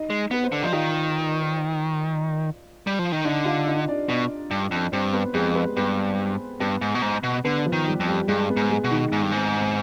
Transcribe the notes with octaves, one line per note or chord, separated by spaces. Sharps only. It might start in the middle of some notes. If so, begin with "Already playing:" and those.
Already playing: D#4 D#5
G#3
B3 B4
C5
D3 D5
F3 D#5
D#3 F4 F5
G3
F3
D#3
D3 D#4 D#5
F4 F5
D#4 D#5
D4 D5
B2
G2
F2
G2 C4 C5
B3 B4
F2 G#3 G#4
B3 B4
G2 B3 B4
G2 B3 B4
G#2
B2
G#2
B2
D3 B3 B4
F3 F4
D#3
G3 G4
F2
G3 G4
G2 G#3 G#4
B3 B4
G#2
G#3 G#4
B2
D#3 D#4
G#2
G2
G#2 C4
C4